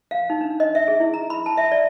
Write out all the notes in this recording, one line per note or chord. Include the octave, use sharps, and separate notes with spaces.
F5
D#4
D4
D#5
E5
G#4
E4
A#5
B5
A5
E5
D5